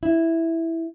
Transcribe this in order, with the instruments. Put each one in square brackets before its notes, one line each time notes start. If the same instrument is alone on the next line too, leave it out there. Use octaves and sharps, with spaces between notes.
[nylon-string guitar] E4